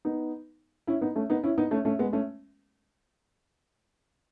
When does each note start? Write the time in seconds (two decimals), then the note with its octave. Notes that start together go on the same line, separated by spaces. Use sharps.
0.05 B3 D#4
0.87 C#4 E4
1.01 B3 D#4
1.16 A3 C#4
1.30 B3 D#4
1.44 C#4 E4
1.58 B3 D#4
1.71 A3 C#4
1.85 A3 C#4
1.99 G#3 B3
2.13 A3 C#4